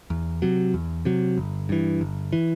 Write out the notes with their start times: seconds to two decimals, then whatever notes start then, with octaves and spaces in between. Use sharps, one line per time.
0.10 E2
0.42 C3 F#3
0.74 E2
1.05 C3 F#3
1.38 G1
1.69 G2 E3
2.01 G1
2.33 E3